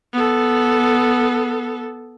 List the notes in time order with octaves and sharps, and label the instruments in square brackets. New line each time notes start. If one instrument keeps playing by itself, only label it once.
[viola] B3 A4